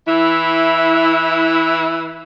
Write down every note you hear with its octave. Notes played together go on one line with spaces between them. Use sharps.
E3 E4